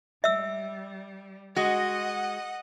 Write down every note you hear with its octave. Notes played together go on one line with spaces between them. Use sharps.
G3 E5 E6
G#3 F#4 D#5 F#5